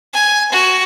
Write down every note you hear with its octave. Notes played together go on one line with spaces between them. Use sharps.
G#5
F#4